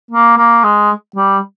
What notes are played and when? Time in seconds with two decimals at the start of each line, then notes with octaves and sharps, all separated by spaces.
0.11 A#3
0.37 A#3
0.64 G#3
1.16 G3